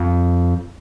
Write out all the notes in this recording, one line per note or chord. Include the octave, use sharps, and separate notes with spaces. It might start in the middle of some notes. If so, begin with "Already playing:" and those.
Already playing: F2